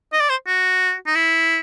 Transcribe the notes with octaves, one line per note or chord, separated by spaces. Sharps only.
D#5
D5
C5
F#4
D#4
E4